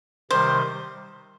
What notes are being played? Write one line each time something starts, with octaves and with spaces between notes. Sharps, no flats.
C3 D#3 G3 C5